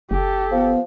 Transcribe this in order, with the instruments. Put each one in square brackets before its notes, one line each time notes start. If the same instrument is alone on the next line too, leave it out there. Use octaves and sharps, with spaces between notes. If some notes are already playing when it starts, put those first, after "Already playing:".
[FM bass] F#1 [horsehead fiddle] G4 A4
[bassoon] F3 [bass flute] B3